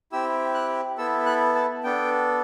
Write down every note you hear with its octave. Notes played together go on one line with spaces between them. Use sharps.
C4 E4 G4 E6
F#6
B3 E4 A4 E6
F#6
A5
B3 D4 A4 G5